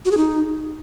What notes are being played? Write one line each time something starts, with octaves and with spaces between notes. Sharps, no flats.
F#4
G#4
D#4